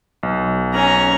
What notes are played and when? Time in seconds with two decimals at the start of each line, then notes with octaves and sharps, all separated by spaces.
0.23 B1
0.74 C#4 A#5